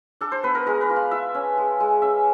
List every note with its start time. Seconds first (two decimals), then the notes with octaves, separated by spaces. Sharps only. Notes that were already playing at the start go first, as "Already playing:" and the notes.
0.21 D4 A4
0.32 C5
0.43 B3 B4
0.55 A#4
0.66 G#3 A#4
0.81 B4
0.89 F4
0.96 F5
1.11 F4 E5
1.34 C#4
1.57 G#3
1.80 G#3
2.02 C#4 E5